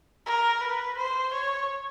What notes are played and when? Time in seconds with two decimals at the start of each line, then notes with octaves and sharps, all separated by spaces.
0.26 A#4
0.61 B4
0.97 C5
1.33 C#5